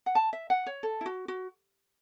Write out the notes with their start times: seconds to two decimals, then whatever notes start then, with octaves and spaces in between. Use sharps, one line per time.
0.06 F#5
0.15 A5
0.33 E5
0.50 F#5
0.66 C#5
0.83 A4
1.01 E4
1.06 F#4
1.28 F#4